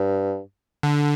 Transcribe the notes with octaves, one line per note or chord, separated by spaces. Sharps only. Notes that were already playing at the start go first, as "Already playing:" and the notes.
Already playing: G2
D3